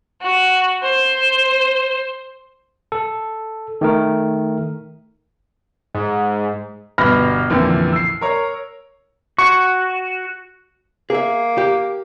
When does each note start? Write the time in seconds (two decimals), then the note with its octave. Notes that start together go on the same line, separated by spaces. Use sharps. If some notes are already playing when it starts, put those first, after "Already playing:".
0.21 F#4
0.82 C5
2.92 A4
3.81 D#3 A3 A#4
5.94 G#2
6.98 G1 B2 B5 F6 A#6
7.50 A1 F2 A#2 D3 E3
7.93 E6 C7
8.21 A#4 C#5 A#5
9.39 F#4 C#6
11.10 A#3 G#4 E5
11.58 G4